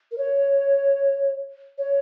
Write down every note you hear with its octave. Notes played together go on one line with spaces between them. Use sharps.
A#4
C#5
C#5